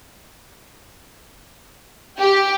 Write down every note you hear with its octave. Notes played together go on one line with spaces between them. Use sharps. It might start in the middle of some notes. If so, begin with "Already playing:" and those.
G4